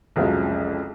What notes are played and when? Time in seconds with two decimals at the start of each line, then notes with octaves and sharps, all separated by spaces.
0.16 C2 F2 C#3 F3 F#3 G#3